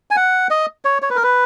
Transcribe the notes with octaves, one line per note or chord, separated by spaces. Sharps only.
G#5
F#5
D#5
C#5
C#5
B4
A#4
B4